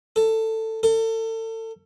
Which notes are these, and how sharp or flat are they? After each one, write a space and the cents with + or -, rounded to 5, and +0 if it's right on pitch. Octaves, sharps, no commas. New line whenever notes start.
A4 +15
A4 +35